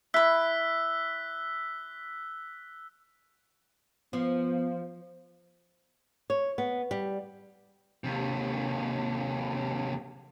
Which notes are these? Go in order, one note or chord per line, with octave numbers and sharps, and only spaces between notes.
E4 B5 E6 F#6 B6
F3 B3
C#5
B3
G3
D#2 C3